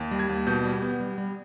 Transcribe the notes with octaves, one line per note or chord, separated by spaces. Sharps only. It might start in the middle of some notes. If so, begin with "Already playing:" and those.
Already playing: D#2
G3
G#6
D#2
B2 G6
G3
B3
G3
G3